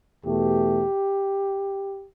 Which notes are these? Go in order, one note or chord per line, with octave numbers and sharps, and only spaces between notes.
E2 B2 A3 G4